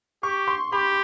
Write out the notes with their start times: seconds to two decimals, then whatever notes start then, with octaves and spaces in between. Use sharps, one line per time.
0.23 G4 C#6
0.47 C6
0.72 G4 B5